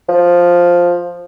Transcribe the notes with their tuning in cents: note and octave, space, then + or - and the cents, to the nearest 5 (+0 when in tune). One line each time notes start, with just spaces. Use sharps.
F3 +5